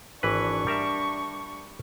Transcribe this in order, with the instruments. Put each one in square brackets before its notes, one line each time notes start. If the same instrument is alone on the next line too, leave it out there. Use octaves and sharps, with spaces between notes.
[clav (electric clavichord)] G#1 E3 B4 [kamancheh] D4 C#6
[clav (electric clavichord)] G3 A#4 E5